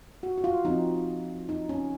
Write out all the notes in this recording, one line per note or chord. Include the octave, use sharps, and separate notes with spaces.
F#4
F#4
F4
F3 C4 D#4
D#4
C#4